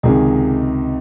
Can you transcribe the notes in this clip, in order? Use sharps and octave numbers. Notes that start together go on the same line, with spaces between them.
C#2 C3 D#3 G#4